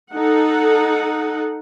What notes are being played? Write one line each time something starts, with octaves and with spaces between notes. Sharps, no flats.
D#4 A4 F#5